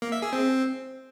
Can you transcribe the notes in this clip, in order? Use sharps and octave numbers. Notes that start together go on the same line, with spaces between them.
A#3
E5
G#4
C4